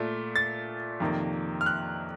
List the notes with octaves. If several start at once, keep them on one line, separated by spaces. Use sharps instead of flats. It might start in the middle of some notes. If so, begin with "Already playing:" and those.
Already playing: A#2 A3
A6
F2 C3 D#3 A#3
F6
F#6